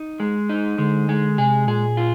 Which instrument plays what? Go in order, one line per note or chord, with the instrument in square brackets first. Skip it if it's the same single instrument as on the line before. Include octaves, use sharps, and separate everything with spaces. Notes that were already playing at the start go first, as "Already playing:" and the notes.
Already playing: [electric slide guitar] D#4
G#3
D#4
[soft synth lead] D3 [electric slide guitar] G#3
[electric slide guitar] G#3
[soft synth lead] C3 [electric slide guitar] G#4
[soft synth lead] A#2 [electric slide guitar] G#4
[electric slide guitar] F4